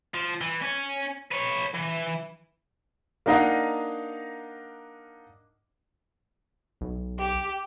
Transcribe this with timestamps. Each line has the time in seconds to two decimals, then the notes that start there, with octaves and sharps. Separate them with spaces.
0.14 F3
0.41 E3
0.62 C#4
1.31 B4 C#5
1.74 E3
3.26 A#3 D4 D#4 D#5 F5 F#5
6.81 B1
7.19 G4